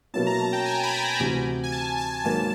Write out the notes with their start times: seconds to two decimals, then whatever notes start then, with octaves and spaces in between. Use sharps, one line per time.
0.14 B2 F#3 A#3 C#4 E4 A5
0.27 A#5
0.40 A5
0.53 G5
0.66 G#5
0.83 B5
0.93 A#5
1.20 D2 C3 E3
1.64 G#5
1.72 A5
1.98 A5
2.24 G#2 D#3 F#3 A#3 A5